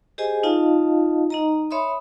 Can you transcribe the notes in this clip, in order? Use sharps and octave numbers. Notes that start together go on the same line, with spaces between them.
G4 G#4 C5 D#5 G#5
D#4 F4 D#5 F5 A5
D#4 D#5 A#5
C#5 E5 B5 C6 D#6